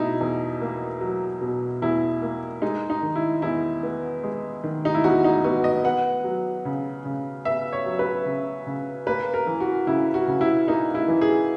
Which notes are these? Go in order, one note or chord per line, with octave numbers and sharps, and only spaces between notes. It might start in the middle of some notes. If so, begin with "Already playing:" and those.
Already playing: B2 D#4 E4
E2
A#3
F#3
B2
E2 E4
A#3
G#3 D#4
D#4
D#3
E4
E2 E4
B3
G#3
D#3
D#4
E4
E2 F#4
D#4
B3 F#4
D#5
B3 F#5
F#3
C#3
C#3
B3 E5
C#5
F#3
B4
C#3
C#3
A#3 B4
A#4
E3
F#4
C#3 E4
F#4
C#3
E4
A#3 D#4
E4
E3
G#4